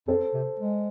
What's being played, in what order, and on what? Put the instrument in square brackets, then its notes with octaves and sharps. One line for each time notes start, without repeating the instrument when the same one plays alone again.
[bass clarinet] F2 [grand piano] A4 C5
[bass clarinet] C3
G#3